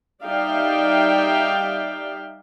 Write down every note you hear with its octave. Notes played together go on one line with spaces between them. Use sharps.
G3 D#4 D5 E5 F5 G5